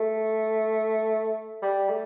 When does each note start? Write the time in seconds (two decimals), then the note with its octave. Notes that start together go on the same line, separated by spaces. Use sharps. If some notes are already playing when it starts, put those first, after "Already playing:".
Already playing: A3
1.62 G3
1.89 A3